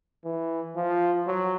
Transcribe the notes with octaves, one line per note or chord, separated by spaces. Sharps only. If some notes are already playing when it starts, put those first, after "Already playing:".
E3
F3
F#3